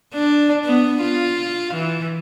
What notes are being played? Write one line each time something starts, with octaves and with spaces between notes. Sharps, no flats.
D4
B3
F4
E3